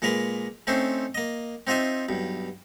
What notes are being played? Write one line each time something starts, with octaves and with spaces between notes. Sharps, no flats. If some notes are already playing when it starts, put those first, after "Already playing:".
A#2 G#3 A#3 A#4 B4
A3 C4 C#4 D#4 C5
A#3 D#5
C4 D#4 F4 D#5 E5
B1 G2